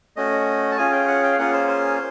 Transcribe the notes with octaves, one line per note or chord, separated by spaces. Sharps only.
A3 C#4 F#4 D#5
A5
C#4 F4 G#4 G#5
G5
F#5
G5
F5
A#3 C#4 F4 G#4 F#5
C5
C5